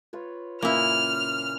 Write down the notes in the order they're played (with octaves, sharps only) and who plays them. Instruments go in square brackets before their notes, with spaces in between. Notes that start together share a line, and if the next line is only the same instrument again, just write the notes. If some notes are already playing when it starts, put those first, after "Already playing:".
[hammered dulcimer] F4 B4 C#5
[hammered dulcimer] A#2 C#3 C5 [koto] A#3 E4 [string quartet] F6